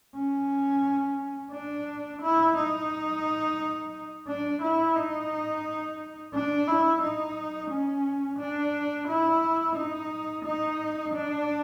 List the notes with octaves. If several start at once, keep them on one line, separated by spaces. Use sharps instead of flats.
C#4
D4
E4
D#4
D4
E4
D#4
D4
E4
D#4
C#4
D4
E4
D#4
D#4
D4